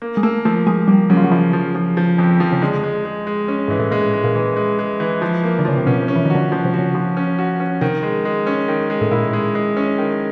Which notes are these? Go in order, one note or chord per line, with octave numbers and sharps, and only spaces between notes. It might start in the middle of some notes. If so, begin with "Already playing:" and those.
A#3
G#3
A3 A#3
F3 A3
F3 G#3
G3 A#3
C#3 F#3
F3
F#3
E3 F3
F3
F3
F3
F2
F3
C#3
D3 G#3
G#3
G#3
G#3
C#4
G#2 E3
A2
A#2 G#3
G#3
A#2
E3
G#3
G#3
E3
F3
A#3
D3
C#3 F3
C3
B2 C#4
C3
C#4
E3
D#3 F#4
D3
C#3 F3
C3
F#4
C#3
F3
C#4
F#4
C#4
C3 D#3
G#3
G#3
C#4
D#3
G#3
A2
A#2 E4
G#3
G#3
C#4
D#3